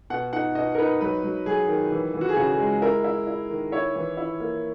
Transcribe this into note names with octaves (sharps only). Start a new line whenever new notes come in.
B2 F#5
D#4 F#5
B2 D#5
A#4
D#4 B4
F#3 B4
F#3
F#3 G#4
D#3
E3
E3
F#4
G#4
C#3 F#4
G#4
G#3
E4 A#4
E4
E4
D#3
E4 C#5
E3
E4
A#3